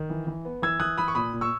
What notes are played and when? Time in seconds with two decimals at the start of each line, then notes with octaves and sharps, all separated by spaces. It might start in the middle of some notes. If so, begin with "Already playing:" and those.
Already playing: D#3
0.10 E3
0.27 E3
0.45 B3
0.62 E3 E6 G#6
0.80 E3 D#6 F#6
0.98 E3 B5 D#6
1.08 C#6
1.15 A#2 B5 D#6
1.33 A#2
1.41 C#6 E6